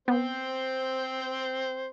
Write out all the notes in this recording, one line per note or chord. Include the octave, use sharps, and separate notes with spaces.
B3 C4 C5